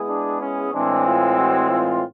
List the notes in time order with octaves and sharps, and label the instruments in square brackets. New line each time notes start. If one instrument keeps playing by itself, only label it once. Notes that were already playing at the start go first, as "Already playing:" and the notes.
Already playing: [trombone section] G#3 B3 E4 G#4
[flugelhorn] D4
C#4
[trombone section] A2 E3 G#3 C4 [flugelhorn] D4
[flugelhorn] F4
F#4
F4